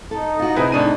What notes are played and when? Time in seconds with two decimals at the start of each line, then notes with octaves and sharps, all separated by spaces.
0.11 D#4 A4
0.40 F4 F#4
0.56 C3 E4 G#4 B4
0.72 A2 D4 D#7